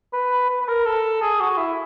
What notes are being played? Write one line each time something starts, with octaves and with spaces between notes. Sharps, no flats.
B4
B4
B4
A#4
A4
G#4
F#4
E4